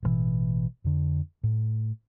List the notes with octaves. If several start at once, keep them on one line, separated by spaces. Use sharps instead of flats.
A1 G2 B2 E3
F2 D3
A2